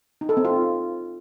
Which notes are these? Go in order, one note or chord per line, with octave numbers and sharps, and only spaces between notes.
D#4
A4
C4
F4